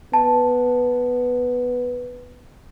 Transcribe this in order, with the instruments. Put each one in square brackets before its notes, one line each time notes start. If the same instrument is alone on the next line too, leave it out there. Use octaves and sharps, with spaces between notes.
[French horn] B3 [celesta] A5